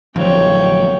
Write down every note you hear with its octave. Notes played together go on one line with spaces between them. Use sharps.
A1 F2 D3 F#3 C#5 G5